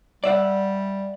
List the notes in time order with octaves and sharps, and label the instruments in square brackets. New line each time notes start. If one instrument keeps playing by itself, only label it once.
[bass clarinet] G3 [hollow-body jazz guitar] D5 E5 F#5